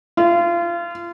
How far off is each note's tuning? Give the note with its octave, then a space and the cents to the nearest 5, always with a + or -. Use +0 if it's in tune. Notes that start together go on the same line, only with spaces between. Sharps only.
F4 -30